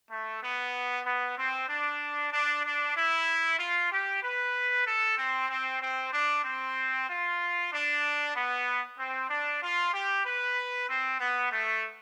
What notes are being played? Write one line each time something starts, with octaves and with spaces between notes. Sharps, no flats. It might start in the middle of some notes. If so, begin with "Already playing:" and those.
A3
B3
B3
C4
D4
D4
D4
E4
F4
G4
B4
A4
C4
C4
C4
D4
C4
F4
D4
B3
C4
D4
F4
G4
B4
C4
B3
A3